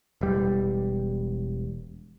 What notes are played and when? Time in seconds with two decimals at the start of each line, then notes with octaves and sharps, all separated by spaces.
0.21 E1 G3